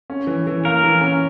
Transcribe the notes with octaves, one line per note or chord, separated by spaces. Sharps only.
C#4
E3
E3
A#3 A#4
E3
C#4